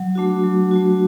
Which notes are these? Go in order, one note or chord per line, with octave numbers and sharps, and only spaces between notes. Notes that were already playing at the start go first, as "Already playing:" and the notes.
Already playing: F#3
A3 D4 F#4
F#3
A3 D4 F#4